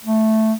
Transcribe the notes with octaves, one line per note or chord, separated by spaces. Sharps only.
A3